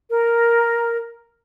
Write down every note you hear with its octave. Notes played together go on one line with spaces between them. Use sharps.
A#4